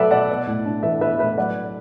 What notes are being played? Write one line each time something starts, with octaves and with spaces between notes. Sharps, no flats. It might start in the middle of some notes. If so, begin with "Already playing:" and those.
Already playing: B2 F#3 A3 A4 B4 D5 E5
B2 D5 F#5
B3
A2
D4
E3 B4 E5
B3 B4 E5
A2 B4 E5
F#3 D5 F#5